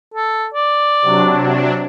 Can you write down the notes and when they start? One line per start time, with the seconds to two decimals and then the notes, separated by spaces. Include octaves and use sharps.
0.14 A4
0.54 D5
1.02 C3 F#3 D4